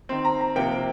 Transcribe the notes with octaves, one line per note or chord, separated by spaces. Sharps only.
D#3 C4 C6
A#5
A#5
C3 F3 A#3 G5